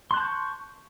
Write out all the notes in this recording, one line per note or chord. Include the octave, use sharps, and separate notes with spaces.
A5 C6 C#6 F#6 G6